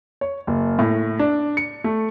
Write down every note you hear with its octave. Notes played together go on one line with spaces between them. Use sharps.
C#5
F#1
A2
D4
C#7
A3